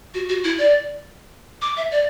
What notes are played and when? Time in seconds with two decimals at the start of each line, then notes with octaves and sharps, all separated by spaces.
0.14 F#4
0.29 F#4
0.44 E4
0.59 D5
1.62 D6
1.77 E5
1.91 D5